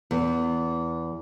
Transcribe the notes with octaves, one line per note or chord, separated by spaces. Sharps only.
E2